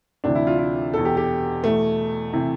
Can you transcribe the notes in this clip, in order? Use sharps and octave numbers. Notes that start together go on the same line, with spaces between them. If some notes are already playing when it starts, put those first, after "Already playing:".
D2 C3 E3 D4
E4
F4
E4
E2 B2 A4
G4
G4
E2 B2 A3
C3 E3